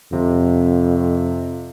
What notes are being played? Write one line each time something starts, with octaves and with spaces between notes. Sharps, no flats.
F2 C3